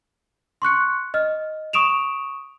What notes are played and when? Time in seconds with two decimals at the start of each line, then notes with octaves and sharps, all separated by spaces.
0.62 C6 C#6 F#6 C#7
1.14 D#5 F6
1.73 C#6 D#6 D7 E7 F7